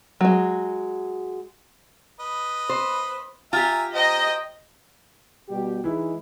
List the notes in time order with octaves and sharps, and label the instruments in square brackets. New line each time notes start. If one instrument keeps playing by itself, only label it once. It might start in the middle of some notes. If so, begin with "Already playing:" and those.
[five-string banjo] F#3 G#3
[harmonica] B4 D#5 B5
[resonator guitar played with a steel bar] C5
[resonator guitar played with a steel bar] F4 G4 [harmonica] E5 G#5 A#5
[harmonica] C5 G5 A#5 [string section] D#5
[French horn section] B2 G3 G4
[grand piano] E3 E4 [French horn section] G#3 D#4